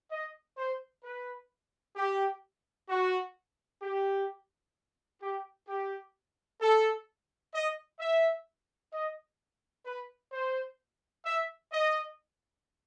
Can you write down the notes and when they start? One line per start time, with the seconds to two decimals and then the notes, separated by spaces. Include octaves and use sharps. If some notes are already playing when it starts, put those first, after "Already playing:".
0.11 D#5
0.58 C5
1.04 B4
1.96 G4
2.89 F#4
3.82 G4
5.22 G4
5.68 G4
6.61 A4
7.54 D#5
8.00 E5
8.93 D#5
9.86 B4
10.32 C5
11.26 E5
11.72 D#5